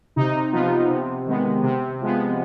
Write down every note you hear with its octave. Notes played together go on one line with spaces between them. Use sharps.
C3 D#4
F3 B3 F4
C3
D#3 G#3 B3
C3
F3 G#3 B3